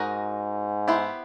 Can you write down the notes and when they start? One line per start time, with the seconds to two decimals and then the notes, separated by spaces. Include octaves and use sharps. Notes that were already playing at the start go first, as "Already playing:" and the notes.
Already playing: G#2 D#4 F#4 A#4 D#5
0.88 B3 E4 G4 C5